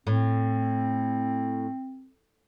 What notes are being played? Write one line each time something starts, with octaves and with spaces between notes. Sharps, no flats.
A2 C4